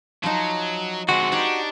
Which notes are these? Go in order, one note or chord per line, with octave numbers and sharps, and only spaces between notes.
F3 F#3 D#4
G#2 D3 G#3 C4 F#4
D4 D#4 G4 C#5